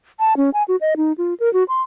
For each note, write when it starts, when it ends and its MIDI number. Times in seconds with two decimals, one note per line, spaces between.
0.20 0.34 81
0.37 0.50 61
0.54 0.63 80
0.68 0.76 66
0.81 0.94 75
0.97 1.13 63
1.18 1.34 65
1.40 1.51 70
1.53 1.64 66
1.68 1.82 84